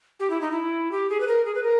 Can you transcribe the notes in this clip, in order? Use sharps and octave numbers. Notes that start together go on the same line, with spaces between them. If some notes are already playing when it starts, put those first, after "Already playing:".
G4
E4
D#4
E4
G4
G#4
B4
A#4
G#4
B4
A#4